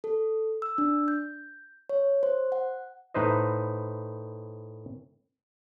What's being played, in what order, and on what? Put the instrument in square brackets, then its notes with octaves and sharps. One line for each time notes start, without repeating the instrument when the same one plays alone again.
[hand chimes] A4
E6
D4
G6
C#5
C5
F#5
[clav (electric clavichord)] A2 D#4 B4 C5 D#5